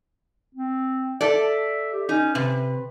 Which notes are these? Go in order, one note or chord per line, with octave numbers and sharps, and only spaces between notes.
C4
A4 D5 E5
G4
C#4 D#4
C3 B4